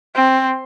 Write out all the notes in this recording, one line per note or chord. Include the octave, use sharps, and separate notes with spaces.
C4